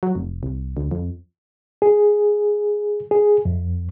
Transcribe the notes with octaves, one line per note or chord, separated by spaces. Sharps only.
F#3
F1
C2
D2
F2
G#4
G#4
F2